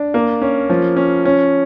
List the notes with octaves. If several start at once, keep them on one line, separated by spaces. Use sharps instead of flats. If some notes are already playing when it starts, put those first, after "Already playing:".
Already playing: D4
A#3
C#4
F3
C#4
C#4